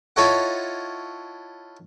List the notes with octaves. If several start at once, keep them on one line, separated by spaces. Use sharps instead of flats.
E4 F4 A4 C#5 D#5 F#5